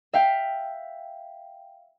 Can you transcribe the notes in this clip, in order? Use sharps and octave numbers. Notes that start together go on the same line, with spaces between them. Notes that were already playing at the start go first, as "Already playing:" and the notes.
E5 F5 G5